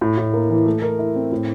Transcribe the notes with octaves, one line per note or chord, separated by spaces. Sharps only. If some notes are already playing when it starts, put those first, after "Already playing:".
A2
A2
A#3
E3
A3
A#4
E4
C4
A2